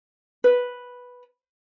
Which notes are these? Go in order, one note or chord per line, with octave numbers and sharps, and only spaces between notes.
B4